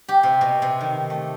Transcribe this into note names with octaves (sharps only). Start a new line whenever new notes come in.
G4
C3
B2
C3
D#3
A3